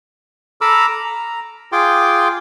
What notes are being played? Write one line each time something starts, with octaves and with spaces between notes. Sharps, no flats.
A4 A#5 B5 D6 E6 F6
A#5
F4 G#4 G5 C6 D6